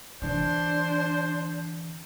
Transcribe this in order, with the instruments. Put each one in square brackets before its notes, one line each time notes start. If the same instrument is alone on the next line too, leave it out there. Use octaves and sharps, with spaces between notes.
[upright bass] D3 E3 [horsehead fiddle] D4 [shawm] C5